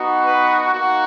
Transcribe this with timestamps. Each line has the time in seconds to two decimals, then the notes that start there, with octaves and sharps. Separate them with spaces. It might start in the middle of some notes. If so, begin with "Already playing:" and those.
Already playing: B3 D#4 F#4
0.25 B4
0.73 A#3 D#4 F#4